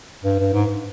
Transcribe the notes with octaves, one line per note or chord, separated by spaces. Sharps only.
G2
G2
G#2